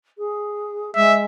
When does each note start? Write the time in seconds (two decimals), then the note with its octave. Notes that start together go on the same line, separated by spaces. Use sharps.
0.18 G#4
0.95 G#3 E5